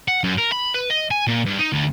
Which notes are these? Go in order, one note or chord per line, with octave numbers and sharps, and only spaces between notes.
F#5
F#2
A#4
B5
B4
D#5
G#5
A#2
G2
D#4
D2